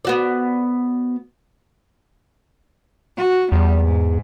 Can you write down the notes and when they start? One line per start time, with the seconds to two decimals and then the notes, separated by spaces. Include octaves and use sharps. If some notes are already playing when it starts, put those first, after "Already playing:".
0.05 B3 F#4 D5
3.17 F#4
3.52 E2 G3
3.83 G#2